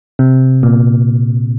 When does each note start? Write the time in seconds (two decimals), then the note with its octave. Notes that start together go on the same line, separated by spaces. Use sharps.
0.19 C3
0.63 A#2